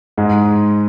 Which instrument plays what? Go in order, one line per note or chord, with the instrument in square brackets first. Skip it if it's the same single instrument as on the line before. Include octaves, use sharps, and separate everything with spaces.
[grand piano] G#2 G#3